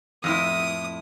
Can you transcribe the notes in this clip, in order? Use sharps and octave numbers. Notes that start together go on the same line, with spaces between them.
F2 A2 E4 D#6